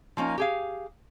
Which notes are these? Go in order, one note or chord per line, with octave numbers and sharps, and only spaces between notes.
F3 A#3 C#4 D#4
G4 G#4 F5